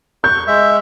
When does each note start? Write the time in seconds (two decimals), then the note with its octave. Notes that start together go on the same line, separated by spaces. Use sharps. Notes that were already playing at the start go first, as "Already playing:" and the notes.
0.24 C#6 G6
0.47 G#3 E5